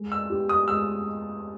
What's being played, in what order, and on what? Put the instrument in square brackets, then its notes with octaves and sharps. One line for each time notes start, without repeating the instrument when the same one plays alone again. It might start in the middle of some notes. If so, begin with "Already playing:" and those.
Already playing: [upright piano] G#3
[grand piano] E6
[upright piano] B3 G4
[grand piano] D#6
[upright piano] G#3 [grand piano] E6